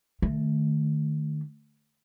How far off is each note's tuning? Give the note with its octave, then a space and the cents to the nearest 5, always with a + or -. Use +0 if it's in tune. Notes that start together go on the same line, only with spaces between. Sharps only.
D#3 -40 A3 +0